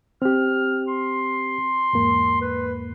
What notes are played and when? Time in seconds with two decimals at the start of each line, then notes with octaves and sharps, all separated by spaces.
0.22 C4 G4 F6
0.88 C6
1.93 E2 G#2 A#3
2.41 B4